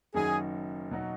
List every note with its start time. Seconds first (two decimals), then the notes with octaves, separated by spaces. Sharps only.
0.14 F#1 F#2 D#3 F#3 D#4 G#4
0.91 B2 F#3 D#4